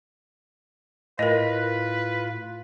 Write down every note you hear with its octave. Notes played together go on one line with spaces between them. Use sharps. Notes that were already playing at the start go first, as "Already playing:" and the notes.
A2 F4 A#4 B4 D#5